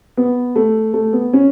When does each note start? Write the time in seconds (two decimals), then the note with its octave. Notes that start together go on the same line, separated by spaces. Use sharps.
0.17 B3
0.56 A3
0.94 A3
1.13 B3
1.33 C#4